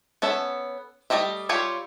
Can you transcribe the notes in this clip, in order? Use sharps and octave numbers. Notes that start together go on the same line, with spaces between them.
B3 C#4 A4 E5
G3 A3 G4 D#5 E5
G3 F4 G4 C#5 E5